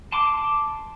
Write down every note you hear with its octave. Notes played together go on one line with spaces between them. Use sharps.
A5 C6 D6